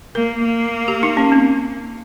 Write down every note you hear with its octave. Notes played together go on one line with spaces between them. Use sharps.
A#3 A#4
A#3
G4
D#4
C#4
C4